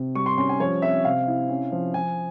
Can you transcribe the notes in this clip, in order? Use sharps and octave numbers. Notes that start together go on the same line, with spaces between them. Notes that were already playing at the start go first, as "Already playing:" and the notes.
Already playing: C3
G3 C#6
C6
C#4 C6
G#5
F3 C#5
C4 E5
C3 F5
E4
C#4
F3
F3 G#5